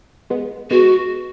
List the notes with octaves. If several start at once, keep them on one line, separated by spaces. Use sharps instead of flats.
G#3 B3
G#3 B3 F#4